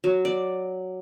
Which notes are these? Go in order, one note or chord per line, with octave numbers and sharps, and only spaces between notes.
F#3
D5